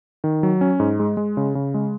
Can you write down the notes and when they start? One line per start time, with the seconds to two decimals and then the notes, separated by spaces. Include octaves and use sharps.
0.24 D#3
0.43 F#3
0.61 C#4
0.80 G#2
0.99 G#3
1.17 G#3
1.37 C#3
1.55 C#3
1.74 G#3